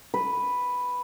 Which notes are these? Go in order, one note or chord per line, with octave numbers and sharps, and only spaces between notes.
B4